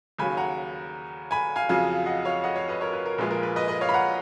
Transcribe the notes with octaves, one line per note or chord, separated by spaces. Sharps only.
D#2 C#3 F#3 G#5 B5
F#5 A#5
G#5 B5
F5 G#5
F2 C#3 F#3 F5 G#5
D#5 F#5
C#5 F5
D#5 F#5
C#5 F5
B4 D#5
A#4 C#5
B4
A#4
A#1 A#2 F3 G#3 B4
A#4
B4
B4 D#5
B4 D#5
C#5 F5
B5
F#5 A#5